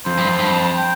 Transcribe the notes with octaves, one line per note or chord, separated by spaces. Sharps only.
F2 C5
G2
F2
G2
F2
G5